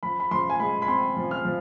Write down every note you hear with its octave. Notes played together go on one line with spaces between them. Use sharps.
F3 B5
B5
F3 C6
G#5
G#3 B5
B5
C4 C6
F3
F6
F3